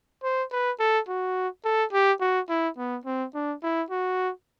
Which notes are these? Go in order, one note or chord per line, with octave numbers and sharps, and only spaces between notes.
C5
B4
A4
F#4
A4
G4
F#4
E4
B3
C4
D4
E4
F#4